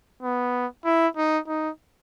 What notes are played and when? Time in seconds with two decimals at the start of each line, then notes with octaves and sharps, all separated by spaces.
0.23 B3
0.85 E4
1.17 D#4
1.48 D#4